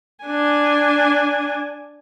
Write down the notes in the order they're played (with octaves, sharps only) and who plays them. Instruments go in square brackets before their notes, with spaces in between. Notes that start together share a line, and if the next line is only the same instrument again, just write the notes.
[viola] D4 G#5